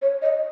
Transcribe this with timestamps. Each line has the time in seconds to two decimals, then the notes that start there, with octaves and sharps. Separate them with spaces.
0.02 C#5
0.22 D#5